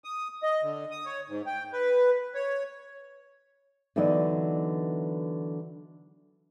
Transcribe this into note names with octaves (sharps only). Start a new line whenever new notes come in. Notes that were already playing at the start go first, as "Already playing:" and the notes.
D#6
D#5
D3
D#6
C#5
G#2
G5
B4
C#5
D3 E3 F#3 B3 D#4 D5